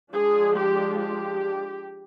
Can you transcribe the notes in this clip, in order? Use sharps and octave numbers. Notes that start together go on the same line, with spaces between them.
F3 G#3 D4 G#4
G4
G4